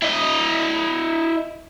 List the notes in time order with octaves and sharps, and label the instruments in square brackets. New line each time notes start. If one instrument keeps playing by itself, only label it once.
[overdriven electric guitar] E4 D#5